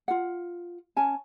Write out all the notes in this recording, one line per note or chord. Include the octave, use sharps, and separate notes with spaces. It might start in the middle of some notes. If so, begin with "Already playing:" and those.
F4 F#5
C#4 G#5 A5